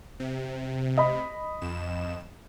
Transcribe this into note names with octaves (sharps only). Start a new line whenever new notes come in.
C3
D#5 B5
F2 E7